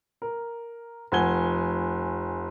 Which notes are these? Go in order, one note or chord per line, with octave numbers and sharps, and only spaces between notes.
A#4
F1 F3 F#5 G#5 G#6 G7